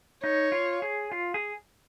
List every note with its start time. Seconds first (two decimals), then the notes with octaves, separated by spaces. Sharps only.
0.23 D#4 C#5
0.52 F4
0.82 G#4
1.12 F4
1.34 G#4